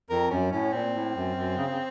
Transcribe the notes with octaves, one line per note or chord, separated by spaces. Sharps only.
F2 A#4
F#2 C#4
A2 C#4
A#2 C4
A2
F#2
F#2
C#3
C#3